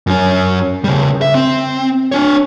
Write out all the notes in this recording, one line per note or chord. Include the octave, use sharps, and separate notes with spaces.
F#2 C#4
C#3 G3
E5
C4
D4 C#5